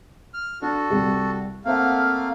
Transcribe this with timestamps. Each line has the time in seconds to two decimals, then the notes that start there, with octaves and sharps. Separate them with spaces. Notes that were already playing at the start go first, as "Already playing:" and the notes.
0.34 F6
0.62 D4 F#4 A4
0.90 C2 G3 G4
1.65 A3 A#3 C4 C5 F5 F#5